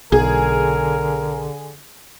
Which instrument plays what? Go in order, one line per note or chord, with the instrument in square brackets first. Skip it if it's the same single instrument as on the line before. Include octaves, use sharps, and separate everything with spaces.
[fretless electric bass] B1 [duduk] D3 [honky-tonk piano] G#4 [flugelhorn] A#4